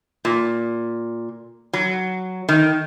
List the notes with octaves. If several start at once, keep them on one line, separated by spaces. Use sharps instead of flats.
A#2
F#3
D#3